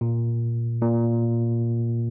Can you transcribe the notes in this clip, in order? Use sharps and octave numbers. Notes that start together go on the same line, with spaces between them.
A#2
A#2